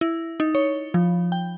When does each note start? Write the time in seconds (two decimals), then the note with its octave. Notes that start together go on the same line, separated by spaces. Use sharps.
0.01 E4
0.40 D#4
0.55 C#5
0.94 F3
1.32 G5